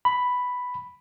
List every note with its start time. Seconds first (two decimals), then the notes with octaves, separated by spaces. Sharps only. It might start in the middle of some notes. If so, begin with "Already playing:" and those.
0.05 B5